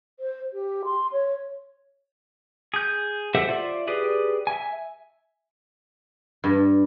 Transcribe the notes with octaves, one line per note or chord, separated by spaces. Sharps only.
C5
G4
C6
C#5
G#4 G6
G4 A4 C5 E5 F#5
F4 C5 D5 E5
G4 G#4 B4 D5
E5 G#5
G2